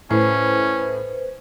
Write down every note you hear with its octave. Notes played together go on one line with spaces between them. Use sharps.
A2 C#4 B4 C5